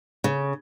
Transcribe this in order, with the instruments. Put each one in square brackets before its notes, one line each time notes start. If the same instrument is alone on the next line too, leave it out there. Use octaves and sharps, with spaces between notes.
[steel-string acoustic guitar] C#3